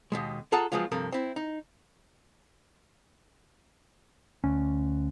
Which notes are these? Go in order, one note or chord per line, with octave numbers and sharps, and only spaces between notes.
D#2 B2 G#3
F4 G#4 A4 F#5 A5 A#5
F3 F#3 G#3 B3 F4
G2 C3 F3 A4 A#4
C4 E4
D#4
D2 C#4